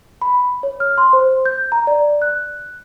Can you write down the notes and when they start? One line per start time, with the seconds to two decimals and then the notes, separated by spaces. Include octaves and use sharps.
0.22 B5
0.63 C#5
0.80 F6
0.98 C6
1.13 C5
1.46 G6
1.72 A#5
1.87 D5
2.22 F#6